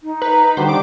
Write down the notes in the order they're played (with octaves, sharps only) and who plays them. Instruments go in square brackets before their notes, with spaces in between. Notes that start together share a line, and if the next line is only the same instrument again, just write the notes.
[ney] D#4
[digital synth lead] B4 [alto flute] A#5
[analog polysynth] D3 D#3 G3 [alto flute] F#4 [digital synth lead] C5
[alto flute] D4 [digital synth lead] D6